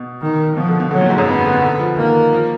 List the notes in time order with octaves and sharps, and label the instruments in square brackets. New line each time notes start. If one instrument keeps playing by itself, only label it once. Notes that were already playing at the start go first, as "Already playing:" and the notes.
Already playing: [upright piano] B2
[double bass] D#3
[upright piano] B2 [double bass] F3
[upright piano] D3
B2
[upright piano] D3 [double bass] F#3
[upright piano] A#2
G#2
F#2
[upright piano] F2 [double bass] B3
[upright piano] D3
B2
D3
F3
[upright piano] D#3 [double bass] A#3
[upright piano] F3